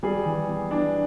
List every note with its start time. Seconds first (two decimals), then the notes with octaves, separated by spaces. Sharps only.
0.03 G3 G#4
0.26 E3
0.48 E2
0.71 E3 D4